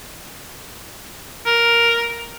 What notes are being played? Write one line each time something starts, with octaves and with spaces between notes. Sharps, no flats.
A#4